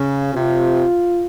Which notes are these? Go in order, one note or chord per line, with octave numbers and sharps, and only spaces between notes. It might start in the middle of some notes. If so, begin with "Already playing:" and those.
Already playing: C#3
C3 F4